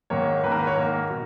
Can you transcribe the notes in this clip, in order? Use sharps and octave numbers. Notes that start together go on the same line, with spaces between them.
G#2 D#3 A#3 C#5
G#2 D#3 A#3 B4
A#4
B4
C#5
G#2 D#3 A#3 A#4
B2